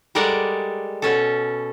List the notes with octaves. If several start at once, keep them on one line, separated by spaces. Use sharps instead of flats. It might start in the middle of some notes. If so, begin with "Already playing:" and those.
G3 G#3 A4 A#4 D5 F#5
B2 C#4 A4